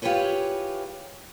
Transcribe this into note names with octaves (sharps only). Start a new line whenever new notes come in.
E4 F4 G4 G#4 B4 C#5